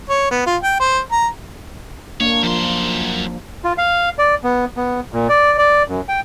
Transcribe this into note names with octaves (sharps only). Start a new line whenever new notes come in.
C#5
B3
F4
G5
C5
A#5
A#3 D4 C#5
F#2 F3 C6
F4
F5
D5
B3
B3
A#2
D5
D5
F#2
G5